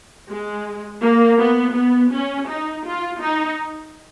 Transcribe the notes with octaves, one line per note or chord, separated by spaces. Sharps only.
G#3
A#3
B3
B3
C#4
D#4
F4
D#4